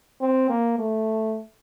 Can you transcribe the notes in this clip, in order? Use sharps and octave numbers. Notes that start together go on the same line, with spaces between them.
C4
A#3
A3